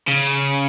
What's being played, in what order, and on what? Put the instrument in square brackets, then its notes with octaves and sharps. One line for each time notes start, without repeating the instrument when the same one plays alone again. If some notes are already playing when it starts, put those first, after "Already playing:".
[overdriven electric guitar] C#3